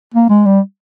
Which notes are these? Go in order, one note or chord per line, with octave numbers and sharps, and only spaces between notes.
A#3
G#3
G3